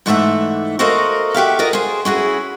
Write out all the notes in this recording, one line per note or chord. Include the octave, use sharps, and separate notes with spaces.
G#2 E3 A3 F#4 E5 F#5
F#4 A4 A#4 C5 D#5 F5
F#4 G4 E5 F5
F4 F#4 A#4 D#5
G#4 C5
C#4 E4 F#4 G#4